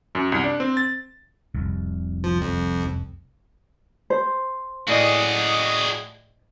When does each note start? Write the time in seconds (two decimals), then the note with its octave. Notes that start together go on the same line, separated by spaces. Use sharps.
0.15 F#2
0.32 C2
0.44 D4
0.60 C4
0.77 A6
1.55 F1 C2
2.24 F3
2.41 F2
4.10 C5
4.88 A2 F#4 G#4 D5 D#5